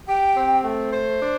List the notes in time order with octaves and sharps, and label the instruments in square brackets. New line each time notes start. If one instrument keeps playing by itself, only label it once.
[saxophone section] G4 [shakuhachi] G5
[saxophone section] C4
A3
C5
D4